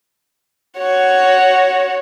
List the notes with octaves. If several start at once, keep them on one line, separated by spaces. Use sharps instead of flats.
F#4 C#5